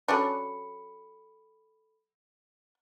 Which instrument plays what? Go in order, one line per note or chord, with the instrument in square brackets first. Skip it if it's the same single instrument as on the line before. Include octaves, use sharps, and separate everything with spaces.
[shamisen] F#3 C#4 D4 [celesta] A4 B5 C#7